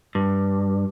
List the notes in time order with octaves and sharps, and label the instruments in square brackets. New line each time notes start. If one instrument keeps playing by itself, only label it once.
[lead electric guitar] G2